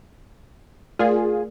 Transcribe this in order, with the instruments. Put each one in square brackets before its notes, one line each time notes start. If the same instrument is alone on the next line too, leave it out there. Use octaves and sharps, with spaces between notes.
[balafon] A3 A#4 D5 [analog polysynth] F4 G#4